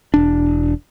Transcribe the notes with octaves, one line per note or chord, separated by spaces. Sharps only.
E1 D4